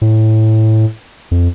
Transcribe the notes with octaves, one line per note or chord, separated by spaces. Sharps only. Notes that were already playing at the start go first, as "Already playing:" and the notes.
A2
F2